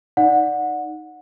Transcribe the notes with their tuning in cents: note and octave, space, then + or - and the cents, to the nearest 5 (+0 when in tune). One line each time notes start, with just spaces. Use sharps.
D#4 +0 D5 +0 F#5 -20